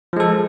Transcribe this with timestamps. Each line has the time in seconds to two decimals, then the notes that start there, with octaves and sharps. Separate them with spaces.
0.13 F3
0.16 G#3
0.20 A4